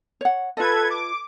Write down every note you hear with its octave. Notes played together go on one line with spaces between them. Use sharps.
C#5 F#5
F4 A4 B4 D#5 G#6
D6